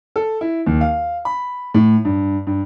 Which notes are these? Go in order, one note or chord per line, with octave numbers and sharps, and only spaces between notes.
A4
E4
D#2
F5
B5
A2
G2
G2